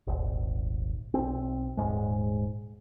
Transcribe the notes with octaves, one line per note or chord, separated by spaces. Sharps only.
D#1 G#1
B1 C4
D#1 G#2 G#3